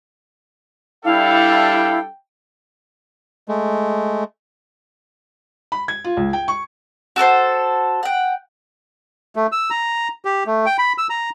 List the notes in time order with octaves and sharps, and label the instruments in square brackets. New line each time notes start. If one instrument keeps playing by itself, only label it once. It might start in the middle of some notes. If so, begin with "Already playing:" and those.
[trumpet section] G3 D4 A4 [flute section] E4 [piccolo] F5 [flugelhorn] G5
[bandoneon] G#3 A3
[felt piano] B5
G#6
F4
C#2
G5
C#6
[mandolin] F#4 A4 A#4 C5
F#5 G5
[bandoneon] A3
E6
A#5
G4
A3
G5
B5
E6
A#5